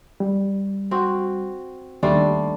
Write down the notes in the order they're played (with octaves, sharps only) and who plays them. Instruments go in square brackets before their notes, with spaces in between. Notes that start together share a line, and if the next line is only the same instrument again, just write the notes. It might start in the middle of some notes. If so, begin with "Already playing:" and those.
[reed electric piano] G3
[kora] C4 F#4
[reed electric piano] D#2 C6 [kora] G3 A3 D4